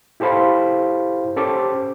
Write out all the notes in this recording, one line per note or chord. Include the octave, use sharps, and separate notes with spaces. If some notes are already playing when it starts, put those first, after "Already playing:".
E4 G4 A4 C5 F5 B5
C#4 G4 A4 C5 D6